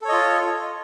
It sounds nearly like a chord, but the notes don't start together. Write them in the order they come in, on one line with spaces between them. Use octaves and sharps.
A4 C#5 D#5 F4